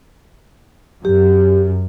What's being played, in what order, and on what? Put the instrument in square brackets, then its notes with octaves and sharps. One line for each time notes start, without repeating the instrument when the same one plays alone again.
[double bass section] F#2 [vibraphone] G4